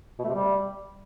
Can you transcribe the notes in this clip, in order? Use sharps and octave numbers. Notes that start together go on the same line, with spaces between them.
B2
A3
C3
G3